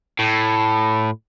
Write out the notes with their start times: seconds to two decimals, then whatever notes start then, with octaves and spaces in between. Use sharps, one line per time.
0.19 A2